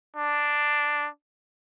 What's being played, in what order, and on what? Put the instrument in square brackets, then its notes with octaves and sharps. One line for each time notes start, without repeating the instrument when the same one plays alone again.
[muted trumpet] D4